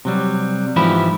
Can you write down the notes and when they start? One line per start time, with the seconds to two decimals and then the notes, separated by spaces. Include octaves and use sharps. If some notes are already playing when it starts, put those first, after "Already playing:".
0.05 C3 F#3 G3
0.76 G#2 E3 F3 E4 G4 B5